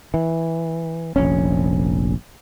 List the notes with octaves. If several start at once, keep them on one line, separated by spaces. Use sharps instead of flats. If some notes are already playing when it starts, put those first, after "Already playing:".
E3
F1 A#1 C#4